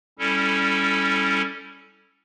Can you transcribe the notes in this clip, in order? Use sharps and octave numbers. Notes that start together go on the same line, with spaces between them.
G3 C#4 E4 A4